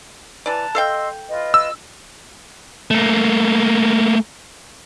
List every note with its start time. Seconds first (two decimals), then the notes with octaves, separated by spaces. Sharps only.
0.46 E3 D5 A5 A#5 F#6
0.75 A4 D#5 F5 G5 C6 E6
1.29 F4 B4 D#5
1.54 E6
2.91 A3 A#3